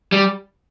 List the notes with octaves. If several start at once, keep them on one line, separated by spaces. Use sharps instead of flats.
G3